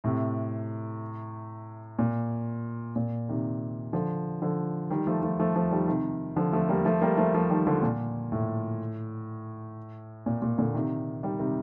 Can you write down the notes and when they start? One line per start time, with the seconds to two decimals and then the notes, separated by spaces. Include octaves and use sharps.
0.04 A2 C3
1.99 A#2
2.96 A#2
3.29 C3 D#3
3.93 D3 F3
4.42 D3 F3
4.90 D#3 G3
5.07 F3 A3
5.23 F3 A3
5.40 F3 A3
5.55 F3 A3
5.71 D#3 G3
5.88 C3 D#3
6.36 D3 F3
6.52 F3 A3
6.69 G3 A#3
6.85 F3 A3
7.02 G3 A#3
7.17 F3 A3
7.34 F3 A3
7.50 D#3 G3
7.67 D3 F3
7.82 A#2
8.32 A2
10.26 A#2
10.42 A#2
10.58 A#2 D3
10.74 C3 D#3
11.23 D#3 G3
11.39 C3 D#3